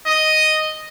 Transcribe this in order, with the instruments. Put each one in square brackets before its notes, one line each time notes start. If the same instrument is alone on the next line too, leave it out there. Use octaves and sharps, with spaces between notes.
[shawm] D#5